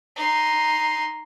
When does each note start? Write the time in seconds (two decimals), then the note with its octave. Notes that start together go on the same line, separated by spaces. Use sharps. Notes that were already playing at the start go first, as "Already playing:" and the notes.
0.16 D#4 C6